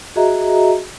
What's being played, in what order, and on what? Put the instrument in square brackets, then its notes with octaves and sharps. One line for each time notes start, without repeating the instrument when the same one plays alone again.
[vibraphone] F#4 G#4 D#5 E5 A#5